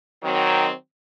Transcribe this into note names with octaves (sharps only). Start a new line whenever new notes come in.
D#3 F#3 C4